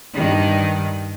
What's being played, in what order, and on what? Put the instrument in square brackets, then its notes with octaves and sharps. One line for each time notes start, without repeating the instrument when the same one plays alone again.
[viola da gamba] G2 D#3